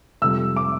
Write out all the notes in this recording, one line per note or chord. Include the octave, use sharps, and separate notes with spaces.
F2 C3 G3 E6
D6